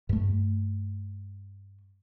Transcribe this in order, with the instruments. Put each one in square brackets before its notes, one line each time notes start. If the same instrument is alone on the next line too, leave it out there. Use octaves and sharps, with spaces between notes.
[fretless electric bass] G2 A3